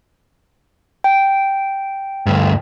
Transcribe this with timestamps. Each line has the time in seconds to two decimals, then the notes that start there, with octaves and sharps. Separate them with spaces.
1.04 G5
2.26 D2 G2